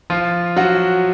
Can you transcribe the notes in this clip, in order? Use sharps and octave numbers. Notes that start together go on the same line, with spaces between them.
F3 F4
F#3 F#4